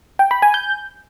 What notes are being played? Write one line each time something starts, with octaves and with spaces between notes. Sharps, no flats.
G5
B5
G#5
G6